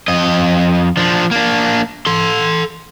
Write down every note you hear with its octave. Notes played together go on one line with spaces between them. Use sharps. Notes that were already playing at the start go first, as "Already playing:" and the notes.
F2 D#5
F3 D4
A#3 D4
A4 C6